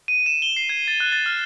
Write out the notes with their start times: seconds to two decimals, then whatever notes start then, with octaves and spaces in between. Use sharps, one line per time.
0.08 D#7
0.26 E7
0.42 G7
0.57 C7
0.69 G#6
0.88 A6
1.00 F#6
1.12 A6
1.26 F6